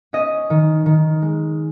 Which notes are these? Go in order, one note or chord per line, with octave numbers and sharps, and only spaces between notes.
C#4 D#5
D#3
D#3
G#3